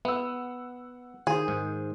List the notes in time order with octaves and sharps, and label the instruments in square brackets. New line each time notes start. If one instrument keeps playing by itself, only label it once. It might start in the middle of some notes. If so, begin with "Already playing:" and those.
[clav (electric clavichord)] B3 [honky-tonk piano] F#5 E6
[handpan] D#3 C5 [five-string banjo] G#4
[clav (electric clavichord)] G#2